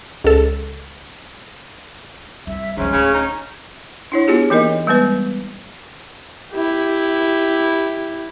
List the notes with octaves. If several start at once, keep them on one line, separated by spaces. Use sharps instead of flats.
C#2 A4
C2 E5
G#2 F3 G#3 C#4
D1 C#3
C#4 D#4
D4 E4 C#5
B3 D4 F4 G4 G#4
E3 A#3 D#4 A#4 D#5
G3 G#3 B3 B4
E4 G4